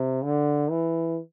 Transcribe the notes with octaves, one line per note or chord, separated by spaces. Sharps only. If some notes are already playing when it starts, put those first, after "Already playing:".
Already playing: C3
D3
E3